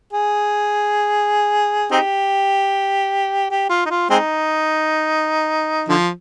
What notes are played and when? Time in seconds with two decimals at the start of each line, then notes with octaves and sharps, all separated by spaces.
0.13 G#4
1.91 C4 D#4 G4
3.51 G4
3.70 F4
3.86 D#4
3.90 F4
4.10 G#3 C4 D#4
5.89 D3 F3